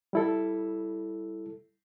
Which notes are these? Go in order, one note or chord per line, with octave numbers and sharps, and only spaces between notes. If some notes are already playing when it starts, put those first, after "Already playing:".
G3 E4 A4